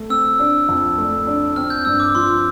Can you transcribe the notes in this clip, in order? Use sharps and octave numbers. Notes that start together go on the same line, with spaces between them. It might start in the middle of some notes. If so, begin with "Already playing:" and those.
Already playing: A3
C4 E6
D4
F2
A3
D4
C4 F6
G6
G2 E6
D6
F3 C6